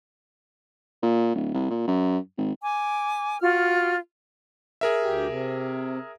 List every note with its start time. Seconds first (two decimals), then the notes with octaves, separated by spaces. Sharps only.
1.03 A#2
1.35 D1
1.54 C2
1.70 A#2
1.88 F#2
2.38 G#1
2.61 G#5 D6
3.41 F4 F#4 F6
4.81 G#4 A#4 E5
5.02 D2 G4
5.27 C3